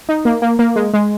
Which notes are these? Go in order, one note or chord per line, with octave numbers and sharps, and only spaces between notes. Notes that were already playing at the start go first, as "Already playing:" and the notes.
D#4
A#3
A#3
A#3
G#3
G#3